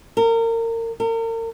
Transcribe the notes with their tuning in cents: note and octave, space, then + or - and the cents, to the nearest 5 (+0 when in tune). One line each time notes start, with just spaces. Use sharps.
A#4 -30
A#4 -40